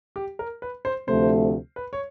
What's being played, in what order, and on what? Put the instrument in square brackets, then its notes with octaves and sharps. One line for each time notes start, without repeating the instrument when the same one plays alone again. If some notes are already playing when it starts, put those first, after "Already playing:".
[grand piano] G4
A#4
B4
C5
[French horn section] D2 C3 F3 A3 [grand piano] C5
[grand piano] B4
C#5